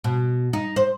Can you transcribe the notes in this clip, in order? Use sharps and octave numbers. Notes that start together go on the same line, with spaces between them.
B2
D#4
C5